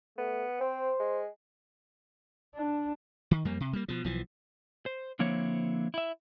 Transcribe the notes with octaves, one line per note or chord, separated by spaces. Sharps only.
A3 B3
C4 C5
G#3
D4
D#3
F2 G3 A#3
C3
G3 A#3
B2 F3
B1 E3 F3
C5
D3 F3 A#3 C4 E4 C#5
E4 E5